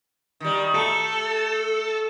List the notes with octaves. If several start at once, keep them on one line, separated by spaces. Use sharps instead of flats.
D#3 G3
A3 A4